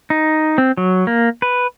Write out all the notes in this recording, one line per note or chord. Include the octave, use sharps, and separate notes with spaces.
D#4
C4
F#3
A#3
B4